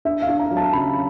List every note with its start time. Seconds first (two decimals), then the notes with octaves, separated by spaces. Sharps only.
0.05 D4 E5
0.22 F5
0.29 D4
0.39 A#5
0.51 F#3
0.57 A5
0.73 C#3 B5